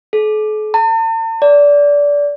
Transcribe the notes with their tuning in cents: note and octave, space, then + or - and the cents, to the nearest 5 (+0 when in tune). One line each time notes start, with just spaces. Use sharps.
A4 -45
A5 +45
D5 -20